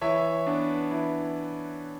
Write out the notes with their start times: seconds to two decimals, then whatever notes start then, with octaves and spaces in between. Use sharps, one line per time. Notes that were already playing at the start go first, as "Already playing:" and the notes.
0.01 E3 C#5 E5
0.47 B3 D4
0.91 E3